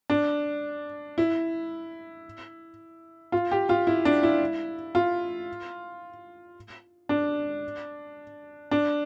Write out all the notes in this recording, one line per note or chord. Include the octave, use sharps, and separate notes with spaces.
D4
E4
F4
G4
F4
E4
D4
E4
F4
D4
D4